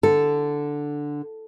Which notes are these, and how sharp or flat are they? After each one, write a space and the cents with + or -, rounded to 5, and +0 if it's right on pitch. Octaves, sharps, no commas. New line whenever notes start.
D3 +0 A4 +0